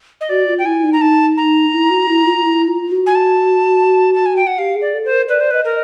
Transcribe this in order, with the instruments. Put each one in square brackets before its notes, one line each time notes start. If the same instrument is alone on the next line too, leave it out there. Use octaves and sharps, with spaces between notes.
[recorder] D#5
[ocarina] F#4 [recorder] D5
[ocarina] F4
[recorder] G5
[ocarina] E4 [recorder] G#5
[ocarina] D#4
[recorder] A#5
[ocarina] D#4 [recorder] A5
[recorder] A#5
[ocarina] E4
F#4
E4
F4
F4
E4
F4
F#4
[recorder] G#5
A5
A5
G#5
G5
F#5
[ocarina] G4 [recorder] F5
[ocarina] G#4
[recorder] D5
[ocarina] A4
[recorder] C5
[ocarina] A#4
[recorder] B4 [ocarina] D5
[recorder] C5
[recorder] B4 [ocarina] D#5
[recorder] A#4